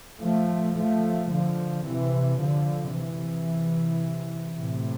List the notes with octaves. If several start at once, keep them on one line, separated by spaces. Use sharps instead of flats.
F3 A3
F3 A3
D3 F3
C3 E3
D3 F3
C3 E3
A2 C3